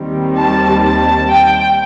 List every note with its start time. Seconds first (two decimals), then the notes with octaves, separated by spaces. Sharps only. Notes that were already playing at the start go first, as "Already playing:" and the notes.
Already playing: D#2 D#3 G3 C4
0.37 A5
0.83 A5
1.29 G5